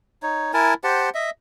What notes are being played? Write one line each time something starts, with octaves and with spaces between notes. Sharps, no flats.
D#4 C#5
E4 A#4 G#5 A5
G4 C5 F#5 A5
D#5 E5